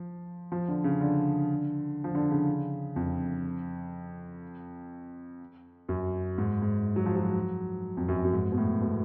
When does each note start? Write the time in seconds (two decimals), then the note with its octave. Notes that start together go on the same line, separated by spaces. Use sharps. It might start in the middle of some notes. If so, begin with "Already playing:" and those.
Already playing: F3
0.52 F3
0.68 D3
0.84 C#3
1.01 D3
2.04 F3
2.15 D3
2.31 C#3
2.96 F2
5.89 F#2
6.38 G#2
6.62 G#2
6.96 F#3
7.06 F3
7.16 F#3
7.97 F2
8.08 F#2
8.25 F#2
8.33 G#2
8.52 B2
8.58 A2
8.82 B2